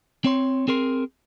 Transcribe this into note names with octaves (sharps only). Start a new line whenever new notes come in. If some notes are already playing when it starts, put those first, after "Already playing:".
C4 C#5 C6
C4 G#4 A#4 C6